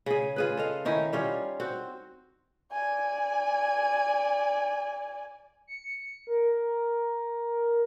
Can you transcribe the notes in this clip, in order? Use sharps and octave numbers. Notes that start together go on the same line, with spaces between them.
C#3 G#4
F4 G#4 B4
A4 D#5 F5
D#3 C#4 D#4 E4
G3 C#4 F4
C4 F#4
D5 G#5
C#7
A#4